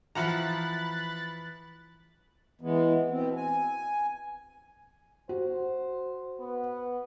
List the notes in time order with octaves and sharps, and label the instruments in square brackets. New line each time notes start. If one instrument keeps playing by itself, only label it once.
[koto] E3 [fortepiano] F3 F#5 A#5 [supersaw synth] B5 F#6 A6
[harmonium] E3 G#3 B3
B2 C4
G#5
[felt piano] F#4 [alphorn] C5
[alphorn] B3